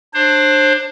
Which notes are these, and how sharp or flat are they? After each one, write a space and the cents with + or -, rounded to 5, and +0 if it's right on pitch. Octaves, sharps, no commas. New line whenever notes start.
D4 +20 C5 +30